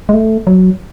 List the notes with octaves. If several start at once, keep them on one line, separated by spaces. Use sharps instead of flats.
G#3
A3
F#3